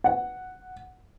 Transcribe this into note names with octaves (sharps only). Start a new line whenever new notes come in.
F#5